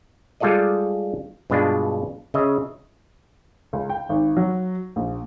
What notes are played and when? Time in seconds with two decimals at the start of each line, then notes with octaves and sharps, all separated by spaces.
0.40 G3 G#3 F4 A4 D5 D#5
1.50 G2 B2 G#3 D4 F4
2.34 C#3 D#5 E5
3.73 C#2
3.90 G5
4.09 G#1
4.37 F#3
4.96 A#1